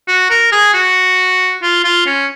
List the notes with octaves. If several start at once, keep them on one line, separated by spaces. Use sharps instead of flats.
F#4
A#4
G#4
F#4
F4
F4
C#4